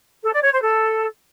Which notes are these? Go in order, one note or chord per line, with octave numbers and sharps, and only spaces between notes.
A4
D5
C#5
C5
A4